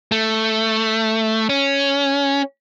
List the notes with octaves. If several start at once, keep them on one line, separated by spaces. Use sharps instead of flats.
A3
C#4